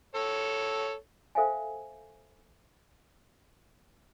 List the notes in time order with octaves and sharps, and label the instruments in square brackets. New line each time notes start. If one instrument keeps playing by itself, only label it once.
[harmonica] A4 C#5
[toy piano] A4 C5 E5 F5 G5 G#5